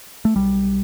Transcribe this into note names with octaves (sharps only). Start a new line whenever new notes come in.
A3
B1 G3